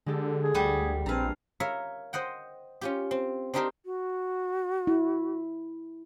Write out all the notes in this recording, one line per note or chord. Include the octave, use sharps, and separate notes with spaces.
D3 G#3 G4 A4
G#4
D2 G3 F#5
A#1 C4 D4 B4 F5 G#5 A#5
A#4 C#5 E5 F5 B5
C5 D#5 F#5 G5
C#4 F4 G4
C4
C4 D4 D#4 G4 A#4 C5
F#4
E4